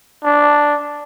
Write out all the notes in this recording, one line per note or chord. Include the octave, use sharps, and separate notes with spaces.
D4